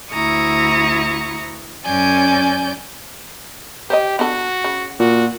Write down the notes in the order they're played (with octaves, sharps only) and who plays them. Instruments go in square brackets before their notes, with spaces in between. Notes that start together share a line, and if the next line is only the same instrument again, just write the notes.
[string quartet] D2 E4 A#5 C#6 D#6
F#2 C#4 D5 G#5 G6
[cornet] G4 [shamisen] C5 C#5 D#5
[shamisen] B3 D4 A4 [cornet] F#4
[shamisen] C#3
[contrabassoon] A#2 [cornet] F#4